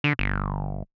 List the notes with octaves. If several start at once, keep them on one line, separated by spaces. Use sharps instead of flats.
D3
G1